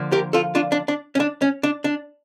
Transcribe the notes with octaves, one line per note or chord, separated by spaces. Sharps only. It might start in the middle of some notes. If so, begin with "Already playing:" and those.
Already playing: D3 F3 A#3
G4 A#4
F4 A4
D4 F4
D4
D4
C#4
D4
C#4
D4
D4